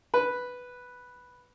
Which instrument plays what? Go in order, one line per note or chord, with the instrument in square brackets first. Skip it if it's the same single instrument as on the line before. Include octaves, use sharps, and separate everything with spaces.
[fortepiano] B4